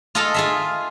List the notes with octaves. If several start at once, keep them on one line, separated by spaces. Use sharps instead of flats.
F4 G#4 A4 D#5 F5 A5
F4 G#4 E5